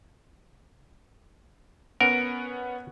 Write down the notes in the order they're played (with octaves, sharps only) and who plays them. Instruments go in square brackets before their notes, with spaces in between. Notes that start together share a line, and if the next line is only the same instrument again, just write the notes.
[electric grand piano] B3 C#4 F#5 [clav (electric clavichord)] A#4